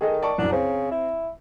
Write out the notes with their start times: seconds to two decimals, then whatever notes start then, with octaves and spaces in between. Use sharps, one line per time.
0.01 D#3 G#4 A4 D#5
0.23 D5 A5 C#6
0.38 C2 F#2 D4
0.52 C#3 C4 C5
0.91 E4